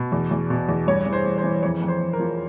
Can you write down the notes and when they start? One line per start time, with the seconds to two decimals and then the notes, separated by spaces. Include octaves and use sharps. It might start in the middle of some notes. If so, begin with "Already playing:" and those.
Already playing: B2
0.12 E2
0.31 E2
0.50 B2
0.69 E2
0.87 G2 C#5
1.06 E3
1.13 C5
1.25 G2
1.38 C5
1.44 E3
1.63 F2 C#5
1.82 F2
1.88 C5
2.01 F2
2.13 A#4
2.20 F3